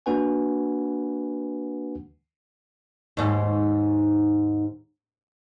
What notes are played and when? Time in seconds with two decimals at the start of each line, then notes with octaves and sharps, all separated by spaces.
0.06 A#3 D4 F#4 B4 F#5 G#5
3.17 D#2 G#2